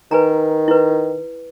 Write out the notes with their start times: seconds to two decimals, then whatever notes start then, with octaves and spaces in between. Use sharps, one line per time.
0.11 D#3 B4 G#5 A#5
0.68 E4 B4